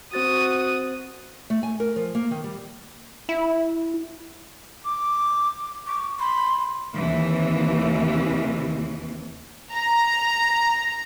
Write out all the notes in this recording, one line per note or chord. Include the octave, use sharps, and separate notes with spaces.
C4 F#4 C5 D#6 A6
A3
G#5
A#4
F3
A#3
D#3
G3
E4
D6
C#6 D6
B5 C6
D#2 C3 E3
A#5